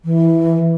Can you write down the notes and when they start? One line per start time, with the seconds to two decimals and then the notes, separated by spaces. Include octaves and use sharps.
0.05 E3